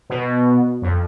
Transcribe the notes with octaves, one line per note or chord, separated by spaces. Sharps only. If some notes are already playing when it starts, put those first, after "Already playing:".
B2
F2